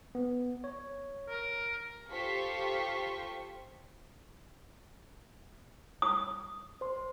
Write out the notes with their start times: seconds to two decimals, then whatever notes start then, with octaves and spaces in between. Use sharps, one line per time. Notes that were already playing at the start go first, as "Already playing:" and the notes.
0.15 B3
0.64 C#5
1.28 A#4
2.10 F4 G4 A4 C5 C#6 B6
6.02 D#6
6.81 C5 C6